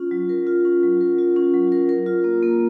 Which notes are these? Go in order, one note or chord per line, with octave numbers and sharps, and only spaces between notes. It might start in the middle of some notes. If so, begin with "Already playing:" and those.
Already playing: C#4 F4
F#3
A#4
F4
C#4
F#3
A#4
F4
C#4
F#3
A#4
A#4
F4
A#3
A#3